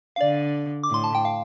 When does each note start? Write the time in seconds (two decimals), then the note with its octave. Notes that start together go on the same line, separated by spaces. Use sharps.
0.16 F5
0.21 D3 D5
0.83 D6
0.90 A2 C6
1.04 A5
1.15 G5
1.25 F5